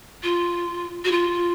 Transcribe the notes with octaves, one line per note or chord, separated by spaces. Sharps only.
F4
F#4
F4